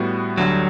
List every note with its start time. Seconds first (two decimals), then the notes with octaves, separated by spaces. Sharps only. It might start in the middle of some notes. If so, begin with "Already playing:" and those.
Already playing: A2 G3 B3 F#4
0.37 D2 D3 F#3 G3